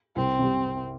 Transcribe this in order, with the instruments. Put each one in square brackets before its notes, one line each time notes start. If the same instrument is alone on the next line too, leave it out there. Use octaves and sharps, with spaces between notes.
[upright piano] C2 [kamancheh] C4
[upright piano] C3 G3